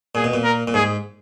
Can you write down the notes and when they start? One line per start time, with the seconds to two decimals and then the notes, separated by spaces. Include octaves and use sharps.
0.15 A#2 G#4
0.24 B2
0.34 A#2
0.44 A#4
0.68 A#2
0.74 G#2 G#4